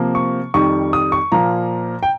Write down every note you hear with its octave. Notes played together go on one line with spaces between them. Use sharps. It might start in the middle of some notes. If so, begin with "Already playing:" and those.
Already playing: C3 F3 A#3
C#6
F2 D#3 G3 C#6
D#6
C#6
A#2 F3 A#3 A#5
G5